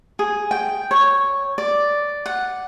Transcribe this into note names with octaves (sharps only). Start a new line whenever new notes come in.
G#4
G5
C#5
D5
F#5